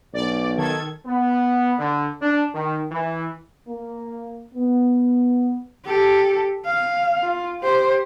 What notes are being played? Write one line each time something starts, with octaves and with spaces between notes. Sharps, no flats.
B1 D5
D#3 A4 G#6
B3
D3
D4
D#3
E3
A#3
B3
G4 A4
F5
F4
G4 C5